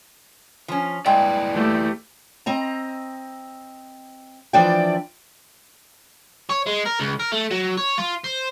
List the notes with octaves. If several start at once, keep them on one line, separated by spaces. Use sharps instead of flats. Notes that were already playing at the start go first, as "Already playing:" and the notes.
F3 C#4
G2 G#3 E4 B4 D5 G5
A3 G4
C4 D#5 A#5
E3 F3 D4 D5 E5 G5
C#5
G#3
A#4
C#2
A#4
A3
F#3
C#5
F4
C5